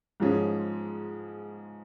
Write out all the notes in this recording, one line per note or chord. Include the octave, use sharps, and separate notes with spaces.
G#2 F3 G#3 C#4 G#4